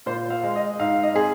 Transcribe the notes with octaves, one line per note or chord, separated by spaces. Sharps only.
A#2 C5
F5
G#3
D#5
G#2 F5
D#5
C4 G#4